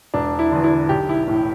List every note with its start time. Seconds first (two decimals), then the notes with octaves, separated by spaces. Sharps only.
0.14 E1 D4
0.39 E4
0.52 E2 D3
0.64 E4
0.89 B1 G4
1.09 E4
1.28 A2 E3